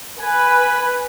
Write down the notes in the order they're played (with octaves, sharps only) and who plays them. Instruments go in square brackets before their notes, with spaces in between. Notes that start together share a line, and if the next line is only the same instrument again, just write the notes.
[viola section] B4 [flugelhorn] G#5